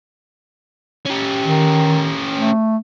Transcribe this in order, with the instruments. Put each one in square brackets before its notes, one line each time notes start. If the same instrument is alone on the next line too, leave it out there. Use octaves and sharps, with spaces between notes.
[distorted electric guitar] C#4 G4
[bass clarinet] D#3
A3